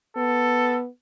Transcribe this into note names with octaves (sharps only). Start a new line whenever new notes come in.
B3 A4